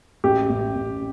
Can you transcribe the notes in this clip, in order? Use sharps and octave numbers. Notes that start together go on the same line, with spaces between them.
A1 G4
A1
A1